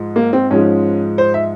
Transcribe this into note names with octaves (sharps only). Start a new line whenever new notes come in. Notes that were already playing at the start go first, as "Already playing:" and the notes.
Already playing: G#2 F3 G#3
A#3
C4
G#2 F3 G#3 C#4
C5
E5